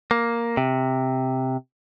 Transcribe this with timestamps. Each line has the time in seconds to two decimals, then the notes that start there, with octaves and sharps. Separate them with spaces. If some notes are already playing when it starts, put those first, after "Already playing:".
0.11 A#3
0.57 C3